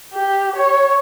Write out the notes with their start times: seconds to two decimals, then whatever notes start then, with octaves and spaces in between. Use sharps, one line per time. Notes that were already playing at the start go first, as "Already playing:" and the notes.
0.13 G4
0.56 C#5